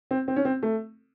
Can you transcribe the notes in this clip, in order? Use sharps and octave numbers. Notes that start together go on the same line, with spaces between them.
C4
C4
C#4
C4
A3